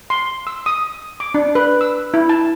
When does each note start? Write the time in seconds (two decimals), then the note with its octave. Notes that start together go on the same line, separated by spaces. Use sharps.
0.10 C6
0.47 E6
0.66 D#6
1.20 D6
1.34 D4
1.55 B4
1.81 E6
2.14 E4
2.29 A5